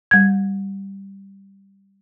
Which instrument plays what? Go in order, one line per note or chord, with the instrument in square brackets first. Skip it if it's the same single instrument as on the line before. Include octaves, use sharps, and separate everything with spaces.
[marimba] G3 G#6